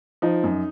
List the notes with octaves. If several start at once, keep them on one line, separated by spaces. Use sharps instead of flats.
F3 D#4
F#2